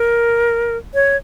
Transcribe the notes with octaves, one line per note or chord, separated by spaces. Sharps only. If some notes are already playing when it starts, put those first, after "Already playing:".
Already playing: A#4
C#5